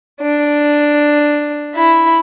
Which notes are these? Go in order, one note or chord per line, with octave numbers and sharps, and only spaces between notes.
D4
E4